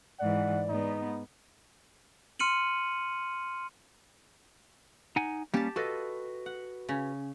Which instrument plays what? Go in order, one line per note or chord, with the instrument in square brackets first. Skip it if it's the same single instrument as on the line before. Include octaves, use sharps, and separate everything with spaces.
[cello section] G#2 E3 [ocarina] D5 [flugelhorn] F#5
[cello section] G#2 B3 [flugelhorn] D#4
[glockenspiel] C6 F6 C#7 D#7 F#7
[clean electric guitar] D#4 F#5 G#5
[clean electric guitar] G3 A#3 C#4 [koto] G4 A5
[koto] F4 A4 [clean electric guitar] F#4 B4 D#5
[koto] F#5
C#3 C#4